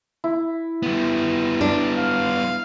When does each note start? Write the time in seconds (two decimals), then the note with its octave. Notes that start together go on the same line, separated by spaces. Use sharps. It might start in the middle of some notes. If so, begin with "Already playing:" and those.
0.24 E4
0.82 G3 B3
1.61 D4
1.98 F5